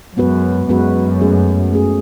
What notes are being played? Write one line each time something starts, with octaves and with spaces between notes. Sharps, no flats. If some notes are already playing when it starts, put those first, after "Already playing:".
F#2 G#3 B3 F#4 B4
F#2 G#3 B3 F#4 B4
A3 C#4 G#4
A3 C#4 G#4